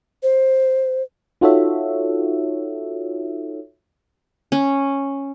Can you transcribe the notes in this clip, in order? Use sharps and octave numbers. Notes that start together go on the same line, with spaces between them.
C5
D#4 F4 F#4 A4 C#5 E5
C#4